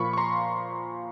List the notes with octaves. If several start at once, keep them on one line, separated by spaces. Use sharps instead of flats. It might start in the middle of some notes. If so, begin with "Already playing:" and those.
Already playing: A#2 F3 A#3 B5 C#6
C#6
A#5 C6